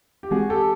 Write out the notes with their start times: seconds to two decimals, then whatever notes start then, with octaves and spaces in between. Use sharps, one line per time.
0.23 G4
0.31 E3 G#3 C4 F#4 G#4
0.50 G4 A4